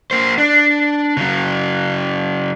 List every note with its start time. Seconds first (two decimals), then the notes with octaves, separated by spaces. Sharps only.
0.11 A#3 C5
0.38 D4
1.17 C#3 F#3